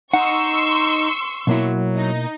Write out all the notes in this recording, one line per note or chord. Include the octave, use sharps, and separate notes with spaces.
D#4 F#5 C6 C#6 E6
B2 F#3 A#3 E4
D#4